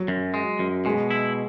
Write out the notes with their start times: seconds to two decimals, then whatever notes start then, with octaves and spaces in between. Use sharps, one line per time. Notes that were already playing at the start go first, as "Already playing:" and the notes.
Already playing: F#3
0.08 F#2
0.34 G#3
0.59 F#2
0.85 B2 G#3
1.10 E4